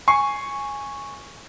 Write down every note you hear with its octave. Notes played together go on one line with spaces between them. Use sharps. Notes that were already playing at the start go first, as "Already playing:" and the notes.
G#5 C#6 C7